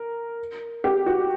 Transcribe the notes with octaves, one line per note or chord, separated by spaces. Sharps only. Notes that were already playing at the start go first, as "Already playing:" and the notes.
Already playing: A#4
G4
F#4